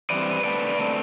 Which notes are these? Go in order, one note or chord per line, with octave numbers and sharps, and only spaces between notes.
E3 G3 C4 B4 D5
D3 A3 C4 B4 D5
D3 A3 C4